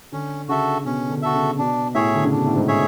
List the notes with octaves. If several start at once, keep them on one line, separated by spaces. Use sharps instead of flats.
D3 C#4
C#3 F#4 A4 E5
B2 C#4
D3
F#4 A4 E5
C#3
B2 D4
A2 G#4 C#5 E5
D3
C#3
B2 D4
A2
G#2
G#4 C#5 E5